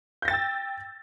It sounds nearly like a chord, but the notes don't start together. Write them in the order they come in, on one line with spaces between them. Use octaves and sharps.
G6 A#6 A6 G5 E6